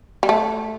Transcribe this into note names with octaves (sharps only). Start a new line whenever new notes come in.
G3
A3